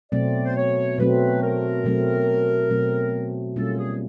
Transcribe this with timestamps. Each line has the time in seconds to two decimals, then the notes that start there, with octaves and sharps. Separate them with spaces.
0.12 B2 F#3 A3 C4 D5
0.45 C5
0.56 C#5
0.98 B2 F#3 A3 C4 B4
1.42 A#4
1.84 B2 F#3 A3 C4
2.70 B2 F#3 A3 C4
3.56 B2 G3 A#3 C#4 F4 A4
3.78 G#4